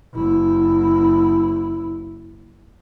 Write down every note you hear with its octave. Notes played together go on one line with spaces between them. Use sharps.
F#1 E4